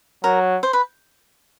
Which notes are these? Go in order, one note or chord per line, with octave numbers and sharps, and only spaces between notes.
F#3 A#4
C5
B4